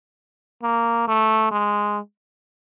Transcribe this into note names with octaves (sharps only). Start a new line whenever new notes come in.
A#3
A3
G#3